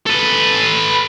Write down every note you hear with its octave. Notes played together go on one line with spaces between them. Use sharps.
A4 B4